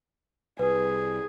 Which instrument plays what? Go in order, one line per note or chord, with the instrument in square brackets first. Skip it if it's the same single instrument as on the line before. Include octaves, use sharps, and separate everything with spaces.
[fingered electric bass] C2 [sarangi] G#4 [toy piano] B4